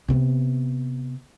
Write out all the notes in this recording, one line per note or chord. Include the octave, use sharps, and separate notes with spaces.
C3 B3